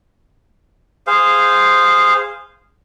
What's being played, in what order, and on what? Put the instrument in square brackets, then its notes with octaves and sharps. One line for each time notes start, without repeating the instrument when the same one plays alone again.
[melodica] G#4 C5 F5